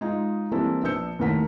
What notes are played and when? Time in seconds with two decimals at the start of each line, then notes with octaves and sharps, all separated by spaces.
0.01 G#3 D#4 F4
0.51 E3 G3 A#3 C4 E4 A4
0.83 A#1 B3 D4 E6 G6 C#7
1.19 D#2 A2 A3 A#4 F#5 B6